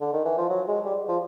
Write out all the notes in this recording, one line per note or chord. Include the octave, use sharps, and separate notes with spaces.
D3
D#3
E3
F3
F#3
G#3
G3
F3